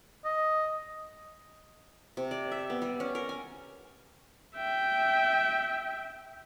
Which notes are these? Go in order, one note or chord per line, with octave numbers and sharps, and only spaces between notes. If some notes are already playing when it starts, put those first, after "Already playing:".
D#5
C3
D5
E5
B3
G3
C#4
A#4
G#5
E5 G5